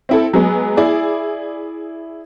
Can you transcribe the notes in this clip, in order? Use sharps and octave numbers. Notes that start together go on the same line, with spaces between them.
C4 E4 A4
F#3 G#3 B3
E4 G#4 D5